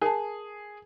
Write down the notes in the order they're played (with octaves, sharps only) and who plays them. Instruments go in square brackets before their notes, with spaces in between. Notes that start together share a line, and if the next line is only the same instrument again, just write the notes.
[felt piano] G#4 [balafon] A#4 A5